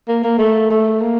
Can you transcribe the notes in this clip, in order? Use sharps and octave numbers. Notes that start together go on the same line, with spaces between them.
A#3
A#3
A3
A3
A#3